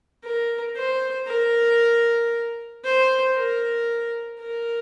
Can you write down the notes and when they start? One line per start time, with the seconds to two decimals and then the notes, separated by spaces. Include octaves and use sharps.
0.24 A#4
0.76 C5
1.27 A#4
2.84 C5
3.36 A#4
4.40 A#4